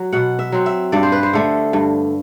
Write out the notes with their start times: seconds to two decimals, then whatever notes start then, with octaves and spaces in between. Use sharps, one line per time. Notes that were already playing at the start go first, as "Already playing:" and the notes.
Already playing: F#3
0.12 B2 F#5
0.39 E5
0.52 F#3 C4
0.66 E5
0.92 G2 D5
1.03 C5
1.12 B4
1.23 C5
1.33 D3 A3
1.73 G2